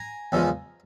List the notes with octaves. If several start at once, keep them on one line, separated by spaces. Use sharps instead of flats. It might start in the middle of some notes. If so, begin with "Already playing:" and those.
Already playing: G#5 A#5
E2 C#3 F3 G#3